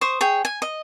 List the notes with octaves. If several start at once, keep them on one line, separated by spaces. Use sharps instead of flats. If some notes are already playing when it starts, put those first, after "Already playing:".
C5 C#6 D#6
G#4 C#5 G5
G#5
D#5